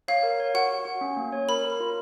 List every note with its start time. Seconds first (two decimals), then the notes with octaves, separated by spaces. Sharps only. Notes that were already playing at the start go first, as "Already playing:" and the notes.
0.08 C#5 F5
0.23 A#4
0.40 C#5
0.55 F#4 F#5
0.70 F#4
0.85 F#4
1.01 C#4
1.17 A#3
1.32 C#5
1.49 A#4 B5
1.64 A#4
1.80 F4